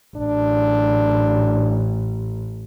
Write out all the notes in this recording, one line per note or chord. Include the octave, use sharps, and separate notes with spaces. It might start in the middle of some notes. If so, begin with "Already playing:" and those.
A1 D4